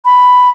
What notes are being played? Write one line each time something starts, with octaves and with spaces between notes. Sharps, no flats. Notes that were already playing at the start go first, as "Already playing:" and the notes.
B5